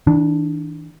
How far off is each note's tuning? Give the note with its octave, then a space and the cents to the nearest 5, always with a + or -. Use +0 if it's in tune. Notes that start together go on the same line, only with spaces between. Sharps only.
E3 -45 D4 +0